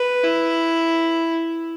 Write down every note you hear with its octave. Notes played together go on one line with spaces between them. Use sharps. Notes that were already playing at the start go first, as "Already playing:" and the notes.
Already playing: B4
E4